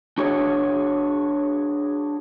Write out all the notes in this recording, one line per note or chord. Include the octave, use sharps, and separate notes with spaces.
D4 F#4 G#4 C#5